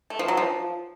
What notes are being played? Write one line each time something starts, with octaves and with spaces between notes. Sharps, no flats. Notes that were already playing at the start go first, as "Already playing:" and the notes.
A3
F3
F#3
F3